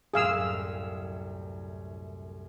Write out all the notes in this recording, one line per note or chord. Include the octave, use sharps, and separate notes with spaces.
C2 F#2 A2 G#4 F5 E6